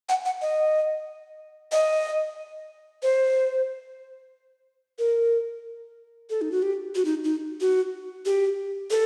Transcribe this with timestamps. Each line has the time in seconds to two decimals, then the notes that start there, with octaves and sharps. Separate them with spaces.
0.09 F#5
0.26 F#5
0.42 D#5
1.72 D#5
3.03 C5
4.99 A#4
6.30 A4
6.41 D#4
6.52 F#4
6.63 G4
6.95 F#4
7.05 D#4
7.24 D#4
7.61 F#4
8.26 G4
8.91 A4